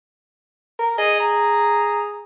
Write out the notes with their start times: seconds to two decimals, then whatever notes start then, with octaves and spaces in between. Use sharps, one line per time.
0.79 A#4
0.98 G#4 D#5
1.20 A#5